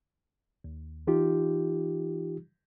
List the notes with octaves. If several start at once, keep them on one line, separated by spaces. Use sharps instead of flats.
D#2
E3 D#4 F4 G4